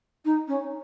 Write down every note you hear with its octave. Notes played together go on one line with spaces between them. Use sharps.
D#4
C#4